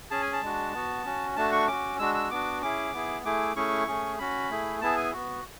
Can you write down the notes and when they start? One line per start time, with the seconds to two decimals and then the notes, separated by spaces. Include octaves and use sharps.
0.11 C#4 G#4 A5
0.22 G#5
0.33 A5
0.43 G#3 D4 F#4
0.74 B3 F#4
1.06 C#4 F#4
1.36 A3 D4 F#4 A5
1.52 C#6
1.67 C#4 F#4 D6
1.99 G#3 D4 F#4 E6
2.14 E6
2.31 B3 D4 F#4 D6
2.62 C#4 E4 G#4 D6
2.93 B3 E4 G#4
3.25 A3 E4 G#4 D6
3.56 A3 C#4 E4 G#4 C#6
3.88 A3 C#4 G#4
4.19 C#4 F#4 B5
4.50 A3 E4 G#4
4.81 B3 E4 G#4 A5
4.97 G#5
5.13 B3 F#4